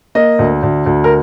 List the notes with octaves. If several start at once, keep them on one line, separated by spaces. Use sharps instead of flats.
A#3 D#5
D2
D2
D2
A#4